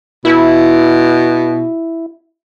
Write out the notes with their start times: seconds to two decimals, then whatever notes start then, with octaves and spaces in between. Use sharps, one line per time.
0.25 B2 E4